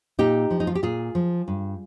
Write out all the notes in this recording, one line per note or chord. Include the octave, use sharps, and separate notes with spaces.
A#2 D#4 G4
F3
D#4
F4
G4
A#2 F4 G#4
F3
G2